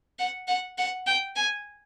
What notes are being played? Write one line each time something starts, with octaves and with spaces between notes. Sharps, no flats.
F#5
F#5
F#5
G5
G#5